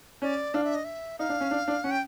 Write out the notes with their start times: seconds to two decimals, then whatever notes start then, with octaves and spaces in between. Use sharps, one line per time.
0.22 C#4 D5
0.54 D4 F5
0.64 E5
0.75 D#5
0.85 E5
1.19 D#4 F5
1.29 D4
1.40 C#4
1.51 D4
1.68 D4
1.84 C#4 F#5
1.91 G5